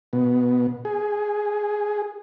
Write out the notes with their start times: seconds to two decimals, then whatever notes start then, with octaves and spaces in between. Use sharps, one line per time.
0.13 B2
0.85 G#4